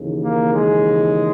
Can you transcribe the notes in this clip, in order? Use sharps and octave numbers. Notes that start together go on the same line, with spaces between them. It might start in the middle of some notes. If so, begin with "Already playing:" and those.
Already playing: D#2 C#3 E3
A#3
G#3